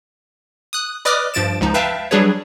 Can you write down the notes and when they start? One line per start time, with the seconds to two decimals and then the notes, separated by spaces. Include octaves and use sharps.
0.73 D#6 F#6
1.05 B4 D5 D#5 D6 D#6 F6
1.34 G2 F3 A6 D7 E7
1.61 C#2 F3 D#4
1.74 B4 E5 F5 G5 A5
2.11 F#3 G3 D4 G#4 B4 C#5